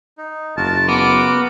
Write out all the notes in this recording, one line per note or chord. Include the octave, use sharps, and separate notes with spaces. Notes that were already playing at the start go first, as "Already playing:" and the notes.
D#4
F#1 F4 F#4 A#4 A5
B3 D6